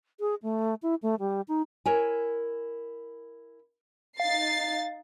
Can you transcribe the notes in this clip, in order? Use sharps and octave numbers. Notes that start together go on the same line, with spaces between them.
G#4
A3
E4
A3
G3
D#4
E4 A#4 C#5 G#5
D#4 F5 A6 C7